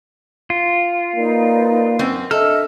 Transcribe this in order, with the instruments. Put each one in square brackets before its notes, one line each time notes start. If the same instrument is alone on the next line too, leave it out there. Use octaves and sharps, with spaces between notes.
[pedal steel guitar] F4
[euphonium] A#3 [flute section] D#4 B4 D5
[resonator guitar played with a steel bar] F#2 C4
[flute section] D4 D#5 E5 [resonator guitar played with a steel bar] A4 [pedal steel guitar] F6